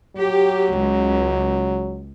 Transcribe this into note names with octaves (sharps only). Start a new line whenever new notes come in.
F#3 G4
C#2